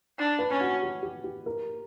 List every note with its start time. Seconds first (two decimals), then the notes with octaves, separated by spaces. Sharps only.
0.18 D4
0.39 B4
0.50 C#4
0.61 F#4
0.82 G4
1.03 G4
1.24 G4
1.46 A#4